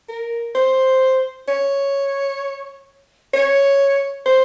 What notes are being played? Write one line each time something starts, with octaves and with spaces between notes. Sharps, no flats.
A#4
C5
C#5
C#5
C5